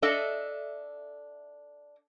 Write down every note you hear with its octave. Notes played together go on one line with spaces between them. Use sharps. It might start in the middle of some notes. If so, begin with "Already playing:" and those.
D4 A4 D#5 E5